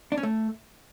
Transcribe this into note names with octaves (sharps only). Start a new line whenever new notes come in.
D4
C#4
A3